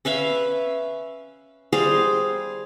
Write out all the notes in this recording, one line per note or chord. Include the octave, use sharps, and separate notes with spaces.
C#4 B4 E5 F5
G3 G#4 C5 F5